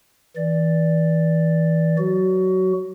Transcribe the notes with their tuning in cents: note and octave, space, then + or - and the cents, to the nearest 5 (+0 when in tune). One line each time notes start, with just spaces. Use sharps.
E3 -25 D5 +0
F#3 +0 F#4 +20